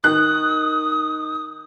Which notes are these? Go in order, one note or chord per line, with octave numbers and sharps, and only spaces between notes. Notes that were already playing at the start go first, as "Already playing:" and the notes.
D#3 D#6 F#6